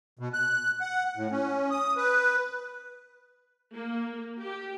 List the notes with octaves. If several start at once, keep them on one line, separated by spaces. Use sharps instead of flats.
B2
F#6
F#5
A2
C#4
D#6
B4
A#3
G4